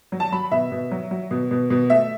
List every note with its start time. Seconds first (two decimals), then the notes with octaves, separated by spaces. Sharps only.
0.12 F#3
0.20 A5
0.32 F#3 B5
0.51 B2 E5
0.72 B2
0.91 F#3
1.11 F#3
1.31 B2
1.51 B2
1.70 B2
1.90 A3 E5